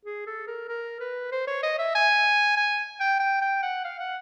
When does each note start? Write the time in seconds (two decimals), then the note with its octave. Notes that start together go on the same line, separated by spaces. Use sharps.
0.05 G#4
0.27 A4
0.47 A#4
0.68 A#4
1.00 B4
1.32 C5
1.47 C#5
1.63 D#5
1.79 E5
1.95 G#5
2.57 G#5
3.00 G5
3.20 G5
3.41 G5
3.63 F#5
3.84 F5
4.00 F#5